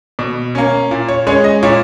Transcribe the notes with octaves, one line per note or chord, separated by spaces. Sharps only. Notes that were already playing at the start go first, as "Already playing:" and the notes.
B2
A#3 C#4
A#2
C#5
G#3 C#4 C#5
D#5
A#2 C#5